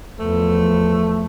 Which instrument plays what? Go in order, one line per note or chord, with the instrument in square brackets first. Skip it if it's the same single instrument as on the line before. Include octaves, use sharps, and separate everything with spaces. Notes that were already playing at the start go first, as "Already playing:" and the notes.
[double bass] E2 F3 [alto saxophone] A3